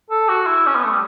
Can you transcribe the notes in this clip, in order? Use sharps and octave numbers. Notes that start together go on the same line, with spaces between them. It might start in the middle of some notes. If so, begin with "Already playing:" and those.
A4
F#4
E4
C#4
B3
A3
G3